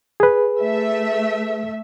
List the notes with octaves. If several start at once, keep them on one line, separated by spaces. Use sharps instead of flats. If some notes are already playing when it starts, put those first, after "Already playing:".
G#4 B4
A3 E5